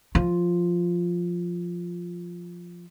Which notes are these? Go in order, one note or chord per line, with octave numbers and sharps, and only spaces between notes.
F3 F4